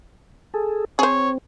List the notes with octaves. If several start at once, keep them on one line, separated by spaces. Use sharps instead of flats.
G#4 A4
C4 G#4 C5 C#5